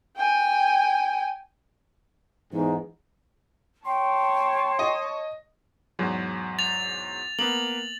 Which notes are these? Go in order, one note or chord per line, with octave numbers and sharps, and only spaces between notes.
G5 G#5
E2 G#2 D#4
C#5 G5 A5 C6
D#5
E2 G#2 F#3
A6 F7
A#3 B3 F#7